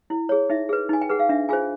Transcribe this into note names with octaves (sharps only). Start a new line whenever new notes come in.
E4
G#4 C#5
D#4 E5
G#4 B4
D#4 G#5
G5
G#4 B4 F#5
F5
D4 E5
F4 G#4 C5 G#5